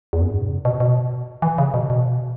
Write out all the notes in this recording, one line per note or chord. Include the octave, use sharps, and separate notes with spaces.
E2
F#2
G#2
B2
C#3
B2
B2
E3
C#3
B2
B2